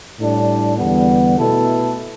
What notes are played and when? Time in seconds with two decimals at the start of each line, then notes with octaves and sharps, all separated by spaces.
0.18 A2 G3 D4
0.78 E2 D3 G3 B3
1.37 B2 A3 E4 A4